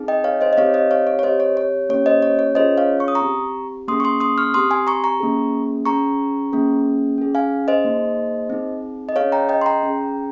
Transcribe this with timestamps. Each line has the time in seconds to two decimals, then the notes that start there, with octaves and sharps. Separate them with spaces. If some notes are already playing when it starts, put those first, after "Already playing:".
Already playing: C4 D#4 G#4
0.08 D#5 G5
0.24 C#5 F5
0.41 C5 D#5
0.53 D#5
0.57 C4 D#4 G4 C#5 F5
0.74 C5 D#5
0.91 C#5 F5
1.07 C#5
1.19 C#5
1.23 C4 G4 C5 D#5
1.40 C#5
1.57 C#5
1.89 A#3 C#4 G4 C#5
2.06 C5 D#5
2.22 C#5
2.39 C#5
2.55 C#4 F4 G#4 C5 D#5
2.77 C#5 F5
3.00 C#6
3.08 D#6
3.15 A#5 C#6
3.22 C4 G4
3.88 A#3 C#4 G#4 C6 D#6
4.00 C#6
4.04 C6 D#6
4.20 C6 D#6
4.38 C#6 F6
4.54 C4 G4 C6 D#6
4.71 G#5 C6
4.87 A#5 C#6
5.04 A#5 C#6
5.20 A#3 C#4 G#4
5.86 C#4 G#4 A#5 C#6
6.53 A#3 C#4 G#4
7.18 C#4 G#4
7.35 F5 G#5
7.68 C5 D#5
7.85 A#3 D#4 G#4
8.50 C4 D#4 G#4
9.09 D#5
9.16 C#4 G#4 C#5 F5
9.32 G5 A#5
9.49 D#5 G5
9.62 C6
9.66 G5 A#5
9.83 C#4 G#4